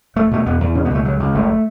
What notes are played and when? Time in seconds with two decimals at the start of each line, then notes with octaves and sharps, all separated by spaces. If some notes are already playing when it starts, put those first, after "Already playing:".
0.16 E1 A3
0.31 B2 A3
0.46 E2 B3
0.60 E2
0.75 B2 C#4
0.85 B3
0.90 C#2 A3
1.04 C#2 F#3
1.20 C#2
1.34 F#1 A3